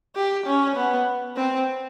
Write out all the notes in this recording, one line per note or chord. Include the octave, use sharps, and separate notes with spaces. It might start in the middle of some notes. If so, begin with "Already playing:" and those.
G4
C#4
B3
C4